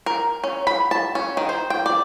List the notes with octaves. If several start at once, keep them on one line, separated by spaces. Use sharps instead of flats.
A#4
C#4
B5
A5
C#4
D#3
C5
G5
D5